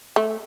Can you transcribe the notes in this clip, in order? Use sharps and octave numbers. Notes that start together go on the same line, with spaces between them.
A3